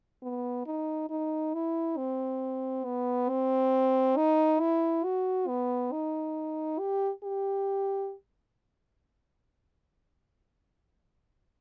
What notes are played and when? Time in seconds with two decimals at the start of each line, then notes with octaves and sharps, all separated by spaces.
0.23 B3
0.66 D#4
1.10 D#4
1.54 E4
1.97 C4
2.85 B3
3.29 C4
4.17 D#4
4.60 E4
5.04 F#4
5.48 B3
5.92 D#4
6.79 G4
7.23 G4